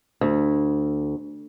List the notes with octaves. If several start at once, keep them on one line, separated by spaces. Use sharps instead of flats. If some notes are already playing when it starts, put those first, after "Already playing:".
D2